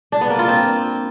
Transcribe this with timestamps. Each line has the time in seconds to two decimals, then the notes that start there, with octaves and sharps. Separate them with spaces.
0.12 D4
0.21 B3
0.30 A#3
0.39 F4
0.48 C4